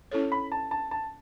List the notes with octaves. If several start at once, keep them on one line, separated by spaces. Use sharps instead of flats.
C#4 E4 A4 C#5
B5
A5
A5
A5